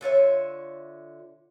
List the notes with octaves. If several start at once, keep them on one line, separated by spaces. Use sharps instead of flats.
D3 F4 C#5 E5